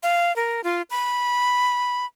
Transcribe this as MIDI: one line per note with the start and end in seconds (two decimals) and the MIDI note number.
0.03 0.34 77
0.36 0.61 70
0.64 0.82 65
0.90 2.06 83